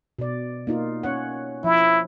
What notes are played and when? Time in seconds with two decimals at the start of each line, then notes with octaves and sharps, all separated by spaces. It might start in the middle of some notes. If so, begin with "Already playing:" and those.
0.19 B2 D5
0.67 A#3 D#4 F4
1.03 C#4 C#5 F#5
1.64 F3 E4